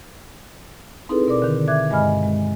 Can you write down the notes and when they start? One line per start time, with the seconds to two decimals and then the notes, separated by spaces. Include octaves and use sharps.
1.09 C4 D#4 E4 G#4 A4 B4
1.27 B2 A#4 D5 D6
1.42 D3 D#3
1.68 E5 D6 F#6 G#6
1.90 G2 G#3 D#5 G#5 B5 F6
2.23 G#3